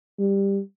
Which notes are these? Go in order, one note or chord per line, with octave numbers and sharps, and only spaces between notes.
G3